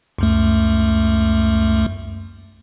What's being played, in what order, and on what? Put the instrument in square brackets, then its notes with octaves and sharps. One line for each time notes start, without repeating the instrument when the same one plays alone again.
[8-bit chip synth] C#2 F#2 A3